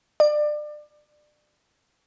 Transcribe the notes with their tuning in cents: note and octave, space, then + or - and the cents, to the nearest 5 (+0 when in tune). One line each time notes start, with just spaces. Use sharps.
D5 +30